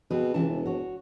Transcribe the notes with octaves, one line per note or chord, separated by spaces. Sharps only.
B2 C4 G#4 B4
C#2 C3 E3 A5
E1
F#4 C#5